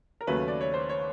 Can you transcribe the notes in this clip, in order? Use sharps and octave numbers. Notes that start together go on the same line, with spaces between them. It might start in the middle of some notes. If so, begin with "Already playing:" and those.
A#4
D#2 C#3 F#3 A3 B4
D5
C#5
C5
C#5